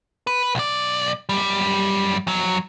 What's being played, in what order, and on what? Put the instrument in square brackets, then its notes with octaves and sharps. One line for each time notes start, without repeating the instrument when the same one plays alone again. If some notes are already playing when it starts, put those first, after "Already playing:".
[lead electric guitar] B4
B1 D5
F#2 G3
F2 F#3